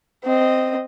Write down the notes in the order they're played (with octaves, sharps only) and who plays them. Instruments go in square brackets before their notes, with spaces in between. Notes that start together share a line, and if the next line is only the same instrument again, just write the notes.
[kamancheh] C4 D#5